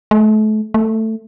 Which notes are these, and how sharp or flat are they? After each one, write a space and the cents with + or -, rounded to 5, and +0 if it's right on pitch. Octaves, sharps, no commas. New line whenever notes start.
A3 -35
A3 +10